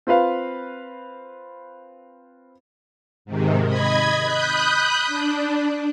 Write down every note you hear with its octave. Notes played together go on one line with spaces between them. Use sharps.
C4 F4 B4 F5
G#2 C3 D#3
D#5 B5 G#6
B5 D#6 F#6 G6
D4